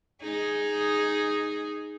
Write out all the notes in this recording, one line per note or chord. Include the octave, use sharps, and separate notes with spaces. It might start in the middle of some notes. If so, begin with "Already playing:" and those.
D#4 G#4